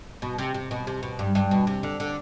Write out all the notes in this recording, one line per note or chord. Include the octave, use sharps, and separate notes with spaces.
B2
C3
C3
B2
C3
B2
G2
G2
B2
C3
D3
D3